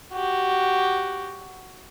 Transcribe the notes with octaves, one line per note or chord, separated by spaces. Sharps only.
F#4 G4